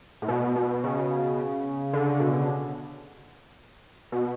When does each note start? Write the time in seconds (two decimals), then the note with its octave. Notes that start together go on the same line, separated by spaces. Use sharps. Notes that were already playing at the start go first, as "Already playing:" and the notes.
0.22 A2
0.28 B2
0.56 B2
0.84 C#3
1.93 D3
2.20 B2
4.12 B2